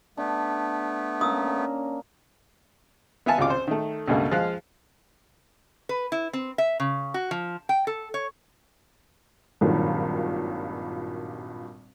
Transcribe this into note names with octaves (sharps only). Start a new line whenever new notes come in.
A3 B3 D4
A#3 C#4 D#6 E6
B3 E5 F5 G#5 A5
G#1 C#2 C3 F4 D6
C5
D#3 A3
C#2 G2 B2 A3 A#3
F3 G#3 F5 F#6
B4
E4
C4
E5
C#3
F#4
F3
G5
A4
C#5
G#1 G2 A#2 D#3 F#3